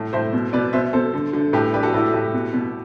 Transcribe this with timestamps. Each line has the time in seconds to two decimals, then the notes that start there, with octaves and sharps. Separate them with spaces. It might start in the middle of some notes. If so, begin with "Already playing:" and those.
Already playing: A2
0.13 A2 C5 E5
0.33 B2
0.53 B2 B4 D5
0.73 B2 C5 E5
0.93 B2 A4 C5
1.13 D3
1.33 D3
1.53 A2 G4 B4
1.73 D4 G4 B4
1.83 F#4 A4
1.93 A2 E4 G4
2.13 A2 E4 G4
2.34 B2
2.53 B2